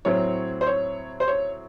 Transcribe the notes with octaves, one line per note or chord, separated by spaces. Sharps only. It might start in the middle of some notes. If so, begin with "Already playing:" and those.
A2 F#3 C4 C#5
C5
C#5
C5
C#5